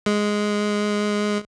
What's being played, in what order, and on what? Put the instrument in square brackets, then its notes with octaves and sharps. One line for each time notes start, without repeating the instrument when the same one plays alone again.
[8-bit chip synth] G#3